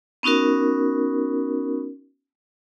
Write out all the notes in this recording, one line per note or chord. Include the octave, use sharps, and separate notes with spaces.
B3 C#4 D#4 F#4 A#4